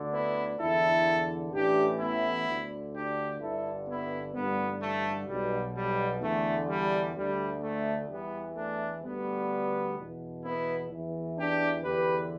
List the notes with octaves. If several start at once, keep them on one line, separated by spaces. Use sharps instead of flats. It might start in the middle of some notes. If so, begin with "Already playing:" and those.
Already playing: D2 D3
B3 E4
E2 D3 E4 A4
A1 A2 E3 D4 G4
B3 E4
D2 D3
D4 G4
G1 G2 D3 E4 A4
B3 E4
A1 G2 D3 G3 B3
A3
B1 B2 G3
G3
E2 D3 A3
G3
D2 D3 G3
A3
E2 E3 G3 B3
A3 D4
D2 D3 G3 B3
E2 B2
B3 E4
E2 E3
D4 G4
E2 D3 G4 B4